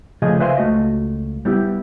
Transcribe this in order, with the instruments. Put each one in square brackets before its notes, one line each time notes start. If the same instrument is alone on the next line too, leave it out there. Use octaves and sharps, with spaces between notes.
[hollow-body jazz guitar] C#3 F3 A3 G#4 D#5
B4 C5 E5 F5 G#5 C6
C#2 A3 F#4 D#5
G3 B3 E4 G4